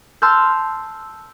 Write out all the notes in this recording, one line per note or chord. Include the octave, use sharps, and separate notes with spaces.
A5 C6 E6 F6 G6